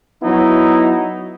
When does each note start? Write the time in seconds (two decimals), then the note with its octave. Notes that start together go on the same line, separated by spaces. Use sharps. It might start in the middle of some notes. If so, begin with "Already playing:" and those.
0.23 F#3 B3 D#4 E4